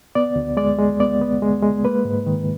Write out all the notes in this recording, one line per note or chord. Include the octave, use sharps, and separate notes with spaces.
B3 D5
D2
G#3 D5
G#3
B3 D5
B3
G#3
G#3
A#3 B4
G#2
D#3